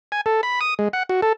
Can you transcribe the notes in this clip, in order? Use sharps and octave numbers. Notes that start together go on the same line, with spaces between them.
G#5
A4
B5
D#6
G#3
F#5
F#4
A4